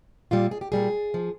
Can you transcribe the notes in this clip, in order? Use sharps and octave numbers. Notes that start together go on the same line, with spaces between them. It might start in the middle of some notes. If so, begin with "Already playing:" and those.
A#2 G3 F4
G#4
G4
A#2 G3 G#4
F3